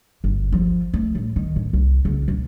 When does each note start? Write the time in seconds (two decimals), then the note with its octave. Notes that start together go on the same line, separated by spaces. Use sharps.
0.24 G1
0.52 F3
0.94 A3
1.15 A2
1.36 D#3
1.56 A2
1.73 C2
2.05 C#2
2.28 B2